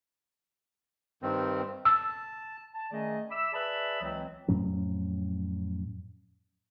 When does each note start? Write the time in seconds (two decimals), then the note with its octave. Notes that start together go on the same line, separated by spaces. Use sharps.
1.22 G2 D#3 C4
1.85 A5 E6
2.74 A5
2.91 D#3 A3 C#4 G#4 D5 D#5
3.31 E5 B5 D6 E6
3.53 G#4 B4 D5 E5 A5 B5
4.01 C#2 E3 F#3 C4
4.48 F2 A2 F#3 C#4